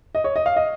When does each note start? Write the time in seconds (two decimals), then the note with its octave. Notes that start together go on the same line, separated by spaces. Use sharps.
0.15 D#5
0.24 C#5
0.36 D#5
0.46 F5
0.56 D#5